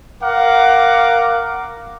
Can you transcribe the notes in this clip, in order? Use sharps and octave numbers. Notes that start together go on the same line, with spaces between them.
A#4 F5 F#5 D6